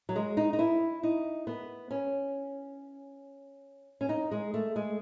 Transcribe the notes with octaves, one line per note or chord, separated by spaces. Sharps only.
F#3
G#3
D#4
D#4
E4
D#4
B3
C#4
C#4
D#4
G#3
A3
G#3